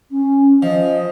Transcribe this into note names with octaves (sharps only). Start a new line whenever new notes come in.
C#4
F3 D#5